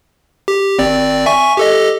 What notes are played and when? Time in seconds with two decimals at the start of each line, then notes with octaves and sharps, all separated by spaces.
0.48 G4
0.79 G#1 C4 D5
1.26 E5 G#5 C#6
1.57 G4 A4 D#5